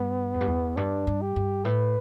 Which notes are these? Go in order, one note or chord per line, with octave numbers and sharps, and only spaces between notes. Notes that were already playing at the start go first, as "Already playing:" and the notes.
Already playing: G2 B3
E2
G2
E2
G2 D4
G2
G4
G2
A2 B4